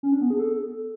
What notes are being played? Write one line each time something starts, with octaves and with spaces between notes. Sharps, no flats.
C#4
D4
B3
G#4
A4